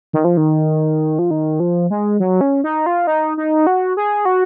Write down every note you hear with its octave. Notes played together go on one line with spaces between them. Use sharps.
D#3
F3
D#3
F3
D#3
F3
G#3
F#3
C#4
D#4
F4
D#4
D#4
F#4
G#4
F#4